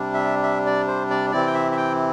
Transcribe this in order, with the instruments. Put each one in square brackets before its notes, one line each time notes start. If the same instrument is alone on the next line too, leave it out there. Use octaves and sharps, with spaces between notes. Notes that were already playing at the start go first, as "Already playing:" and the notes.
Already playing: [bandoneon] C3 G3 D4
E5
E5
D5
C5
D5
C3 E3 C4 E4 D5
G5
E5
E5
G5